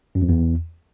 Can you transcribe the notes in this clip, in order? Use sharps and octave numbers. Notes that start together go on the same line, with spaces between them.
F#2
F2
E2